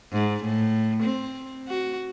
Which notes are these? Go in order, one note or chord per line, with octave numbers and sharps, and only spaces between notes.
G#2
A2
C4
F#4